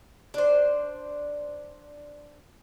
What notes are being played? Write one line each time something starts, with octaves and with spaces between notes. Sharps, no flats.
D4 C5